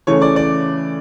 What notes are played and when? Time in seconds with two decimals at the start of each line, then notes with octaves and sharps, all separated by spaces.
0.07 C#3 E3 A3 C#5
0.22 D5
0.36 D5